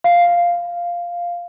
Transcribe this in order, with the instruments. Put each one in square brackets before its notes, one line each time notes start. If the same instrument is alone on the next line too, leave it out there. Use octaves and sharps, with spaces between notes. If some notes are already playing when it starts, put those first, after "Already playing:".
[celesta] F5